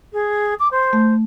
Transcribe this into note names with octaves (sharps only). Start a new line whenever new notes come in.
G#4
D6
C5
A3